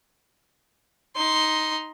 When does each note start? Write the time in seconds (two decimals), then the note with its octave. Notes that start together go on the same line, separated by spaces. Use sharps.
1.16 D#4 C6